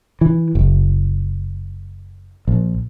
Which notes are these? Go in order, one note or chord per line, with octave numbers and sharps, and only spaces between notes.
E3
F#1
A#1